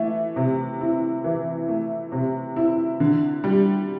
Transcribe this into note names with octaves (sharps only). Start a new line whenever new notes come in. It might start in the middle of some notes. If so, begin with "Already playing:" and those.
Already playing: E3 A3
C3
E4
E3
A3
C3
E4
D3
G3